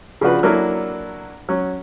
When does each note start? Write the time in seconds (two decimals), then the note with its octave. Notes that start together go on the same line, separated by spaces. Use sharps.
0.21 C#3 F3 D4 F#4 B4
0.43 F#3 A#3 D4 E4 A4 A#4
1.49 F#3 C#4